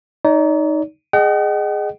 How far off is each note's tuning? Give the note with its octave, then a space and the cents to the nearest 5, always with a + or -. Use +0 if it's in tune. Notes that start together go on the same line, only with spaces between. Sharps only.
D#4 +0 D5 -45
G#4 +0 D#5 -25 F#5 +45